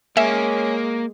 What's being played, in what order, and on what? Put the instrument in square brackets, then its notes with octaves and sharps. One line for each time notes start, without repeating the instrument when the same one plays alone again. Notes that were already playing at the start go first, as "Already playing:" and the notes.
[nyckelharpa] G#3 [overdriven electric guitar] A#3 [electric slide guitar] C#5 G#5 [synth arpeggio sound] E5